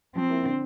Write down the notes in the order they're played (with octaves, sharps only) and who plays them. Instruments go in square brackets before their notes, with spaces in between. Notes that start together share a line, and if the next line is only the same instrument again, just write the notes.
[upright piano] F3 [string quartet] C4
[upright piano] A#3 E4
D3